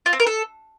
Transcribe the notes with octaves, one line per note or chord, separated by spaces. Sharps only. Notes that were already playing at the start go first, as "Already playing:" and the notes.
F4
C4
A#4
A4